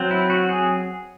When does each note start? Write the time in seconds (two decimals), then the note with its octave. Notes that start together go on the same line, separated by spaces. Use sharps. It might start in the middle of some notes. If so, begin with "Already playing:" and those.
Already playing: F#3 C4
0.11 E4
0.30 F#4
0.49 G#4